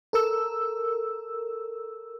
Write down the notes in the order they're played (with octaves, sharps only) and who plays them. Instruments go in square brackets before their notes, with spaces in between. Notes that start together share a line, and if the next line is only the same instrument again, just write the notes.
[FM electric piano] A4 A#4 E6